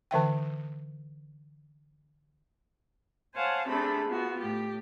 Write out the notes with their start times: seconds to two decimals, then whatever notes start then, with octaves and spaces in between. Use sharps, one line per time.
0.11 D3 E3 E5 G5
3.35 C5 C#5 F5 F#5 G#5 A5
3.68 C3 A3 C4 D4 G#4 B5
4.08 B3 F4 F#4
4.41 A2 G4